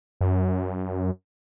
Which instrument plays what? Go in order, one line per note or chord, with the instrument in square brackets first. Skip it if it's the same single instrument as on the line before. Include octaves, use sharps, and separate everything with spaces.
[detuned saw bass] F#2